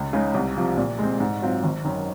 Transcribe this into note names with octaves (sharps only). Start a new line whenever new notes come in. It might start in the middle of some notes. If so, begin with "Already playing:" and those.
Already playing: C#2
C#3 G#3 D#4
C2
C3 F3
A#2
G#3 C4
G#2
F#3 C4 F4
G#1
F#2 D#3